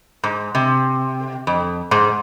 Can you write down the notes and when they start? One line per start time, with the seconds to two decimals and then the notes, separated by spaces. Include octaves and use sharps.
0.24 G#2
0.55 C3
1.47 F2
1.91 G#2